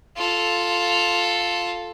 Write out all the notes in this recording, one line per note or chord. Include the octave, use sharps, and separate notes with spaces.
F4 A4